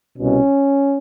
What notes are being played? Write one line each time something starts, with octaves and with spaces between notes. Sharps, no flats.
C2 B2 C#4